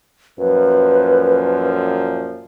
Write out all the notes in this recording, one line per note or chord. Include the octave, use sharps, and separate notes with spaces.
F#2 A#2 F3 B4